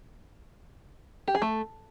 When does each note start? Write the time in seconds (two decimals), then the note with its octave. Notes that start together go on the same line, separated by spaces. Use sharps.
1.28 G4
1.35 G#4
1.42 A3